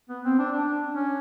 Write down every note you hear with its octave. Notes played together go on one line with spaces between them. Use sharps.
B3
C4
D4
D4
C#4